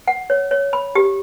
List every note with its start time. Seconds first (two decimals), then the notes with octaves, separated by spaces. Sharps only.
0.07 F#5
0.30 C#5
0.51 C#5
0.73 B5
0.95 G4